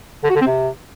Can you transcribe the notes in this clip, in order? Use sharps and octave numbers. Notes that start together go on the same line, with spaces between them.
D3
F#4
D3
C4
C3